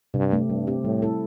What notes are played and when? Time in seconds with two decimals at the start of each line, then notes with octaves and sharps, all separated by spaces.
0.14 G2 C3
0.32 A3 C4 G4
0.49 G2 G3
0.67 C4 G4
0.84 A2 G3
1.02 E4 A4